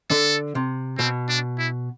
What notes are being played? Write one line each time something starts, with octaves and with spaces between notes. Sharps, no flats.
D3 A4
C3
B2 C4
D4
E4